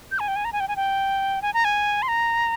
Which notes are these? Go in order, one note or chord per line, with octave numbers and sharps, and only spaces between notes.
G6
G#5
G5
G#5
A#5
G#5
G5
G#5
G5
G#5
A#5
G#5
C6
A#5